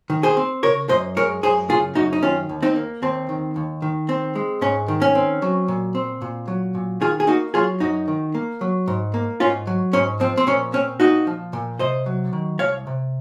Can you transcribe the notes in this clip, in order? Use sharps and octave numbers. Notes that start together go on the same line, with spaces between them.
D#3
G#4 C5
C4
C#3 A#4 C#5
F#2 C5 D#5
G#3 A#4 C#5
F#2 G#4 C5
C#3 F4 G#4
F#2 D#4 F#4
D#4
D#3 C#4 F4
D#2
C4 D#4
A#3
D#2 C4
D#3
D#2
D#3
C4
G#3
G#2 C#4
D#3
C#4
C4
F#3
A#2
C4
A#2
F#3
A#2
D#3 F4 G#4
G#4
A#3 D#4 F#4
F#3 F4 G#4
F#2 D#4 F#4
D#3
A#3
F#3
G#2
A#3
G#2 C#4 F4
F#3
G#2 C#4
F3 C4
C4
A#2 C#4
C4 C#4
A#2 D#4 F#4
F3
A#2
C3 C5 D#5
F#3
D#3
C2 C#5 F5
C3